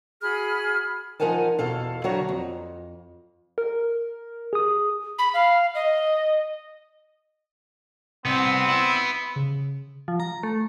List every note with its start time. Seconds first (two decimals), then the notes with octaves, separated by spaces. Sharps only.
0.22 F#4 G#4 B5 F6
1.20 F3 D#4 A#4 F#5 G#5 A5
1.59 E2 B2 A4 F5
2.04 D3 F#3 F#4 C#5 E5 A#5
2.29 F2
3.58 A#4
4.53 G#4 D#6
5.19 B5
5.34 F5
5.75 D#5
8.26 C2 B3 C4
8.68 E4
9.36 C#3
10.08 F3
10.20 A#5
10.43 A3